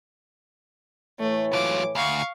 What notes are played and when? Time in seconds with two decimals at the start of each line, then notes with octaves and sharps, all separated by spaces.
1.19 A2 E3 A3 C#5
1.53 F#3 F4 D6
1.95 D2 F5 C#6